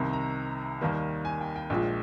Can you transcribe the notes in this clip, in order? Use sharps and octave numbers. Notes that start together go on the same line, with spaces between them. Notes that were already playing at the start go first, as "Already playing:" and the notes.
Already playing: C2 C3 D#3
A#5
D#2 D#3 G3 A#3
G#5
G5
G5
A#1 A#2 F3 G#3 G5